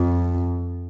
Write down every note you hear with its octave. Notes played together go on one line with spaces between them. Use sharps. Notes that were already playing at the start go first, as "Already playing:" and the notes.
Already playing: F2